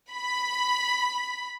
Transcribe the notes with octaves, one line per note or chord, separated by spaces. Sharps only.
B5